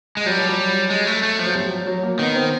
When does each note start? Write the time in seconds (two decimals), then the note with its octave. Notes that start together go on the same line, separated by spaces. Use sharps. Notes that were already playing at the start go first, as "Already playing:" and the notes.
0.17 G#3
0.26 F#3 G3
0.37 F3
0.48 F#3
0.90 G#3
1.07 A3
1.23 A3
1.39 F3
1.46 F#3
1.55 G3
1.71 F#3
1.87 F#3
2.03 A#3
2.19 D#3 B3
2.35 C4